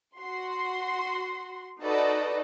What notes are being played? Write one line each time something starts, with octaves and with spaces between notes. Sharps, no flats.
F#4 C6
D#4 F#4 A4 B4 D5 D#5